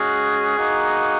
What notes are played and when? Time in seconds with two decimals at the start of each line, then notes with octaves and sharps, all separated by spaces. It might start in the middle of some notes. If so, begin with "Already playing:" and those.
Already playing: G#3 C#4 F#4 G#4
0.56 A#3 D#4 F#4